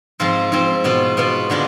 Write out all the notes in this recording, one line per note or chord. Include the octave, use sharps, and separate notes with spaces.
G#2 F3 C4 F4
G#2 F3 C4 F4
B2 B3 F4
B2 B3 F4
D3 G#3 B3 D4 F4